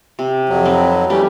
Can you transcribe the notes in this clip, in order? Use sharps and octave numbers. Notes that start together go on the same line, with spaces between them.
C3
F2 F#3
C4 D#4 B4
E3 G3 A3 C#4 G4